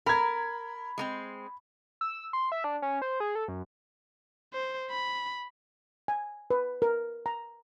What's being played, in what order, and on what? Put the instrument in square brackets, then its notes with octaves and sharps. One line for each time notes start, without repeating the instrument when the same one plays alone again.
[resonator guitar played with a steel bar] A#4 [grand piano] B5 G#6
[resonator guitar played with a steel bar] G#3 A#3 C4
[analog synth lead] E6
C6
E5
D4
C#4
C5
G#4
A4
F#2
[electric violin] C5
B5
[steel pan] G#5
B4
A#4
A#5